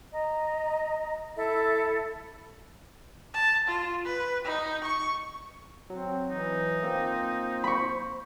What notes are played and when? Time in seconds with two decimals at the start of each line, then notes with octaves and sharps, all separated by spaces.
0.13 D#5 A#5
1.36 E4 A4 E5
3.34 A5
3.68 F4
4.05 B4
4.45 D#4
4.84 C#6
5.90 F#3 C4
6.30 E3 D#4
6.83 A#3 C4 F4
7.05 C5
7.64 B5 C#6